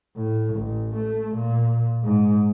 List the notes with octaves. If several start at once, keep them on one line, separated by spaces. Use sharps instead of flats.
A2
A1
A3
A#2
G#2